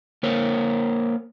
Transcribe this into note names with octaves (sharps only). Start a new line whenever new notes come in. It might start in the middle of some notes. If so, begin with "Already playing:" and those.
A#3 A#4 C5 C#5